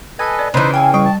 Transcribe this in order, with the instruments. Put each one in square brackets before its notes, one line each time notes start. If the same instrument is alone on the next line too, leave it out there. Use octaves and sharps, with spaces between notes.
[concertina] A4 B4 D#5 [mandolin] G#5
[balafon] D5
[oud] C#3 E3 [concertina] D#4 B4 C5
[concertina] F5 [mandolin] G5 G#5 E6
[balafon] G3 [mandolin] G5 C#6
[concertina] A5